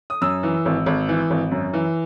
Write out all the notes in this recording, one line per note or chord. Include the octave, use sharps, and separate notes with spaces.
D#6
F#2 E6
E3
G#1
G#1
E3
G#1
F#2
E3